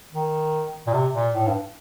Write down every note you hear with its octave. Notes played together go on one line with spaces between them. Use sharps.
D#3
A#2
C3
A#2
A2
G2